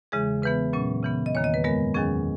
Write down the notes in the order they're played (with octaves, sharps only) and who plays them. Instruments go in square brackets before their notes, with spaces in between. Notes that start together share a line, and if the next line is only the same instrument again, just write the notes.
[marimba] E2 C#3 E3 G#3 G#4
C#3 E3 B3 B4
A#2 F#3 C#4
C#3 E3 B3
D#5
E2 D#3 A#3 C#5
D#5
B4
F#2 D#3 G#3 B3 A#4
E2 D#3 F#3 C#4 G#4